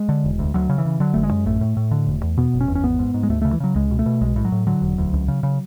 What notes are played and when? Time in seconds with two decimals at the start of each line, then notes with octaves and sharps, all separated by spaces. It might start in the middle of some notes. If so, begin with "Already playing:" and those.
Already playing: G#3
0.09 D3
0.24 E1
0.39 D2
0.54 D2 F#3
0.69 C#3
0.78 E3
0.85 C#3
1.00 D3 F#3
1.14 G#1 A3
1.23 G#3
1.31 F#2
1.46 A1 A3
1.61 A2
1.77 A2
1.91 D3
2.07 E1
2.23 E2
2.37 B2 B3
2.53 F#1
2.61 C#4
2.68 E2
2.75 C#4
2.83 G#1 B3
2.99 G#2
3.14 G#2
3.23 G#3
3.29 D2 A3
3.42 C#3 A3
3.53 E3
3.60 C#3 F#3
3.75 C#2 G#3
3.91 B2
3.99 A3
4.06 B2
4.21 B1 G#3
4.36 A2
4.45 F#3
4.52 A2
4.67 D3 F#3
4.82 E1
4.98 D2
5.13 C#2
5.28 C#3
5.43 C#3